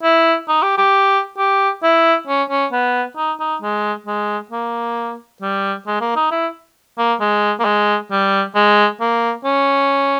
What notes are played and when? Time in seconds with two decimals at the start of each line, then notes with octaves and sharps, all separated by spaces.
0.03 E4
0.48 D#4
0.62 G4
0.78 G4
1.38 G4
1.83 E4
2.27 C#4
2.50 C#4
2.72 B3
3.16 D#4
3.40 D#4
3.62 G#3
4.06 G#3
4.51 A#3
5.42 G3
5.87 G#3
6.01 A#3
6.16 D#4
6.31 E4
6.98 A#3
7.20 G#3
7.59 A#3
7.65 G#3
8.11 G3
8.55 G#3
9.00 A#3
9.44 C#4